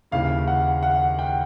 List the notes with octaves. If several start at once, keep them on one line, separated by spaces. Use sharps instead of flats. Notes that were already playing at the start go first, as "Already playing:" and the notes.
D#2 C#3 E3 F5
F#5
F#5
G5